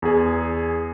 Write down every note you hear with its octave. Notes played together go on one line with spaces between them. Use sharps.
E2 G#4